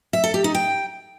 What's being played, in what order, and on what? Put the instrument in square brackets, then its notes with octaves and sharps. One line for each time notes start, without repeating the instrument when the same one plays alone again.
[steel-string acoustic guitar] E5
A4
G4
D#4
G5